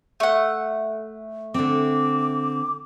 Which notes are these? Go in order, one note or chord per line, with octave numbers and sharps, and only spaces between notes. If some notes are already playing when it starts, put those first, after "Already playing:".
A3 F#5
D3 C4 D6